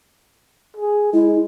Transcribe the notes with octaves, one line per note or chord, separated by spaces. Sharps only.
G#4
G#3 E4